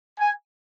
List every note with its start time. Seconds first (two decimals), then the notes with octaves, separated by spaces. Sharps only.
0.19 G#5